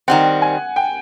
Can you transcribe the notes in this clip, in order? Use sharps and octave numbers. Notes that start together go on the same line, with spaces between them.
D#3 G3 C4 F#5
G#5
G5